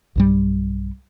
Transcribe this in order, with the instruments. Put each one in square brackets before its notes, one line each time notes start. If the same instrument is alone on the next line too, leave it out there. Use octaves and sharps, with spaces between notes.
[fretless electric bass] B1 G2 G3